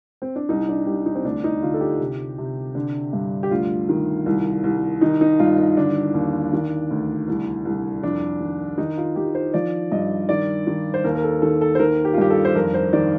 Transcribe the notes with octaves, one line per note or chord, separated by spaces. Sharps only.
C4
D4
C2 D#4
D4
C2 G4
D#4
C4
D2 D4
D#4
D3 F4
A4
G4
C3
C3
D3
G2
G4
D2 F4
D#3
C2
C2
D#3 D#4
D#4
G2 F4
D#4
D3 D4
D#2
D#3
D2
C2
C2
F2 D4
D#3
D#3 D#4
F4
D#3 G4
C5
F3 D5
G2 D#5
D#3 D5
D#3
C5
D#2 A#4
A#4
A4
D#3 A4
A4
C5
D#3 A#4
G4
F4
G2 G4
A4
C5
F2 A#4
C5
D#3 D5